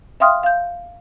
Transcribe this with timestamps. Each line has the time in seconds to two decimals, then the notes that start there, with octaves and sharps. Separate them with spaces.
0.20 E5 F5 G5 C6 D#6 F6
0.43 F5 G6